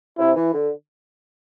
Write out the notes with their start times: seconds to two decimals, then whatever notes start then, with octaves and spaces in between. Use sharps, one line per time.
0.18 C3 E4
0.36 E3
0.53 D3